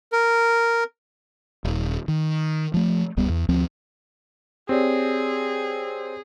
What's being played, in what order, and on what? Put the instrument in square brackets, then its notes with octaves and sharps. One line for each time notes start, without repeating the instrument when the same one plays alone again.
[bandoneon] A#4
[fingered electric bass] D#1
D#3
F3 A3
D1 C#2 G3 B3
E2
D2 F3 C4
[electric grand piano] C4 [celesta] G4 C#5 D5 [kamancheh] G#4